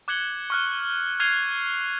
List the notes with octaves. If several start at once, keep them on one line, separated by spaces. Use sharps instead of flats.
D6 F#6 G#6 C#7 F#7 G7
C#6 F6 F#6
F6 F#6 G#6 C7 D#7 F7